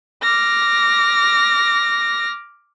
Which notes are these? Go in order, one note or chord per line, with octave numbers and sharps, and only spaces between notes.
D6 F6 A#6